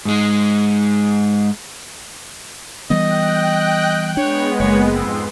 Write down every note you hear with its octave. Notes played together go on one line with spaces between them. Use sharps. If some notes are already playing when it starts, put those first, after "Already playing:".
G#2 G#3
E3 G3 B3 D#5 G5 F#6
G#3 B3 D4 C#5
F#1 A#3 C#5
F2 G#2 C4 C6